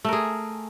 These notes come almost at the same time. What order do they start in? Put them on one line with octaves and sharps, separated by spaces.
A3 A#4 G#4